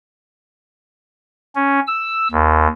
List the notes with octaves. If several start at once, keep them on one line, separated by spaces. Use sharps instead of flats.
C#4
E6
D#2